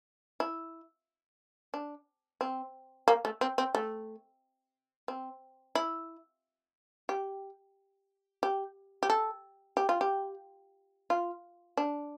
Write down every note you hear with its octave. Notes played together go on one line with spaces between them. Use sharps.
E4
D4
C4
A#3
A3
C4
C4
A3
C4
E4
G4
G4
G4
A4
G4
F4
G4
F4
D4